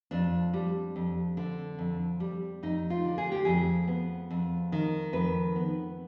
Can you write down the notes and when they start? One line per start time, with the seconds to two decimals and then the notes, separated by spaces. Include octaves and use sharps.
0.11 F2 D4
0.53 G3
0.96 F2
1.37 D3
1.79 F2
2.20 G3
2.63 F2 D#4
2.90 F4
3.04 D3
3.18 G#4
3.32 G4
3.45 F2 G#4
3.87 B3
4.30 F2
4.72 D#3
5.13 F2 B4
5.56 B3